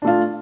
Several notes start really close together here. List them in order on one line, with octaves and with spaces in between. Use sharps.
D4 A3 F4